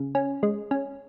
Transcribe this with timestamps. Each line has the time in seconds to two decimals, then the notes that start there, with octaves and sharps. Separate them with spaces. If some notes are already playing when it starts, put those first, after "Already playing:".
Already playing: C#3
0.15 C#4
0.43 G#3
0.71 C#4